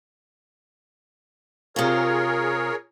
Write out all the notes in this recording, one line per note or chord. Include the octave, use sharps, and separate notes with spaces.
C3 F4 G#4 A#4 C#5